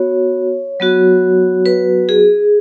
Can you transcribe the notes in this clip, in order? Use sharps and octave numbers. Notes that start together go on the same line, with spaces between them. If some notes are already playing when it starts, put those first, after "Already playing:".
Already playing: B3 F#4 C#5
F#3 B3 F#4
B4
G#4